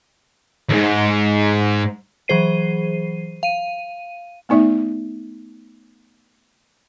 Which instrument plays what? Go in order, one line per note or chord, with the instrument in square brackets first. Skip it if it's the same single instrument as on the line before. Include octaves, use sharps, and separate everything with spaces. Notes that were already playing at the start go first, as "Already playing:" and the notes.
[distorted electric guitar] D#2 G#2
[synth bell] E3 F#3 G#4 C5 C7 D#7
F5 D#7
[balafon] A3 B3 D#4 D5 E5